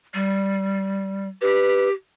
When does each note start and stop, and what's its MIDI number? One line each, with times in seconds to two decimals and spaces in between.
0.14 1.28 55
1.42 1.92 67
1.42 1.89 71